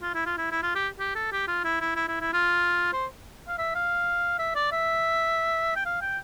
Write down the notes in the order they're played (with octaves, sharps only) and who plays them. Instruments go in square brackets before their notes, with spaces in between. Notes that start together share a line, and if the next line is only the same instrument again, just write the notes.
[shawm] F4
E4
F4
E4
E4
F4
G4
G4
A4
G4
F4
E4
E4
E4
E4
E4
F4
C5
F5
E5
F5
E5
D5
E5
G5
F5
G5